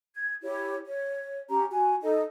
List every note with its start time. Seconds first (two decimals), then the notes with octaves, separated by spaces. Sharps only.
0.14 G#6
0.43 E4 G4 C#5
0.85 C#5
1.49 C#4 G4 A#5
1.70 F#4 G#5
2.02 D#4 A4 D#5